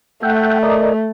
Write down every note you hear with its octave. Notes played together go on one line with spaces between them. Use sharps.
A3 E5 F#5 G5
A#4 D5 D#5